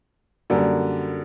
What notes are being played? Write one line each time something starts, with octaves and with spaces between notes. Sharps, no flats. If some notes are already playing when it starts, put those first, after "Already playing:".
F#2 D3 G3 A#3